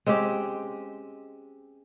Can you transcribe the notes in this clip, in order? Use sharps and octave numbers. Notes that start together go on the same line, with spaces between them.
G#3 C4 C#4 G4